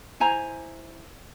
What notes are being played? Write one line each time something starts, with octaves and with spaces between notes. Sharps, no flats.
E4 C5 G#5 A#5